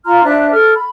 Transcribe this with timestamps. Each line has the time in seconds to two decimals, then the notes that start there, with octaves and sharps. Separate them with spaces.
0.05 F4 A#5 C6 F6
0.24 D4 C5 E5 F#6
0.51 A4 F6
0.75 B5